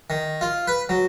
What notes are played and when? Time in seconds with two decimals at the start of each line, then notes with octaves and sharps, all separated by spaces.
0.10 D#3
0.41 F4
0.67 B4
0.89 F#3